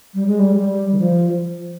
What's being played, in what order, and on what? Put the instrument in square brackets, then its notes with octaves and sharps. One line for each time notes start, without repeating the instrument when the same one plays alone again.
[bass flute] G3
G#3
G3
G3
D#3
F3